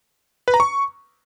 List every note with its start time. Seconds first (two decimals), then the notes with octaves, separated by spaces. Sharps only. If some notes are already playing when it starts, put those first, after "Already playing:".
0.48 B4
0.54 A#5
0.60 C#6